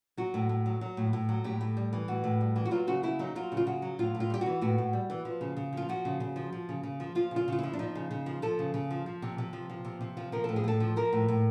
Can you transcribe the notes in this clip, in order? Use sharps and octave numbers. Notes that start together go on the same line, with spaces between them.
F#3 F#4
A2
A2
F#3
F#3
A2
A2
F#3
A2 G4
A2
G3
E3
A2 F#4
A2
G3
E3
F#4
F#3 F4
C#3 F#4
C#3 E4
F#3 D#4
F#3 F4
C#3
F4
C#3 F#4
F#3
A2 F4
A2
F4
G3 G4
E3 F#4
A2 F#4
A2
G3
E3
F3
C#3
C#3
F3 F4
F3 F#4
C#3
C#3
F3
F3
C#3
C#3
F3
F3 F4
C#3
F4
C#3 F4
F3 E4
D4
F3 D#4
C#3
C#3
F3
F3 A4
C#3
C#3
F3
F3
C3
C3
F3
F3
C3
C3
F3
F3 A#4
A2 A4
G#4
A2 A4
F3
F3 A#4
A2
A2